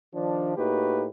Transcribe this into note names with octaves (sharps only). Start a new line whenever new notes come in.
D#3 F3 D4
A2 A#3 D#4 F#4 G4 B4